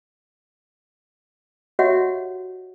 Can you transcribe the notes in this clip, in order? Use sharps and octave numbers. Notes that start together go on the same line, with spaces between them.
F#4 G4 C#5 D#5 E5 F#5